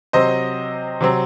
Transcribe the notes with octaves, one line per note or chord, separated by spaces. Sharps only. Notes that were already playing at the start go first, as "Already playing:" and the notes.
C3 F#3 C4 C5 D#5
C3 F#3 C4